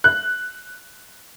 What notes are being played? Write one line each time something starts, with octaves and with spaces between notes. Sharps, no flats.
F#6